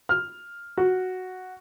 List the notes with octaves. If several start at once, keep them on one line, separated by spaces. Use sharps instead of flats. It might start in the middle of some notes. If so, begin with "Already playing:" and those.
F6
F#4